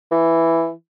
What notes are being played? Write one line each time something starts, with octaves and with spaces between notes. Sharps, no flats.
E3